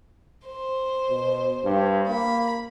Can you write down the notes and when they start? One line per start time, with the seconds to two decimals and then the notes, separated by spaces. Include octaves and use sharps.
0.46 C5
1.10 B2
1.65 G2
2.08 A#3 B5